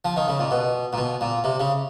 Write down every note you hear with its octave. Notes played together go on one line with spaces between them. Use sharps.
F3
D#3
C#3
A#2
B2
A#2
B2
A#2
C3
C#3